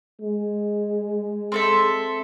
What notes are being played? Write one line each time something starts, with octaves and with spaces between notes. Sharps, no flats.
G#3
C4 A4 E5